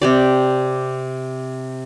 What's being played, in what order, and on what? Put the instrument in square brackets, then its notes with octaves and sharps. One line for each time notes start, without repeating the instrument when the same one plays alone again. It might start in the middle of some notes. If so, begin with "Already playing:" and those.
[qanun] C3 G4 D5